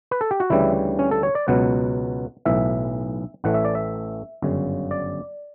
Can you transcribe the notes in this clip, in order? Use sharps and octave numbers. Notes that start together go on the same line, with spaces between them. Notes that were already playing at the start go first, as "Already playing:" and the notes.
B4
A4
G4
F#4
D2 C#3 E3 G3 E4
C#4
A4
C#5
D5
C#2 B2 F#3 B3 F#5
B1 A2 E3 E5
A1 A2 E3 A3 F#5
E5
D5
E5
G1 F#2 C#3
D5